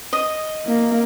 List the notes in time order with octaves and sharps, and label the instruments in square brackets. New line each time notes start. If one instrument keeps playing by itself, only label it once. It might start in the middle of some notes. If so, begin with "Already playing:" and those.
[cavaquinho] D#5
[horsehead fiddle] A#3